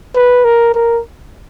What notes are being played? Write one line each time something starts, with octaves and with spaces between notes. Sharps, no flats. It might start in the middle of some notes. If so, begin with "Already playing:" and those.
B4
A#4
A#4